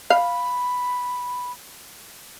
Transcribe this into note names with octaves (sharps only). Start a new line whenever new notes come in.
F5 B5